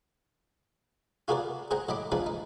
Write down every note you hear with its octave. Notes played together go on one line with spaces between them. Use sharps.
F4 F#4 G#4 A#4 B4 D5
G#4 C5 F#5 G5 A#5
A2 F#3 D#5 B5 D6
F3 D4 D#4 G#4 B4
D#4